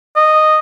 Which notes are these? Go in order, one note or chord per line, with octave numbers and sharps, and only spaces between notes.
D#5